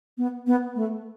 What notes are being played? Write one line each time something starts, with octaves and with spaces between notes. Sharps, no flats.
B3
B3
A3